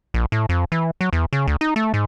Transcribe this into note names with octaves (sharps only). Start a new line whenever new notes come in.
A#1
A2
F2
E3
F#3
E2
C#3
D2
D#4
A3
G#2